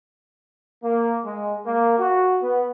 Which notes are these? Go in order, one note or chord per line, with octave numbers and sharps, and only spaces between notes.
A#3
G#3
A#3
F#4
B3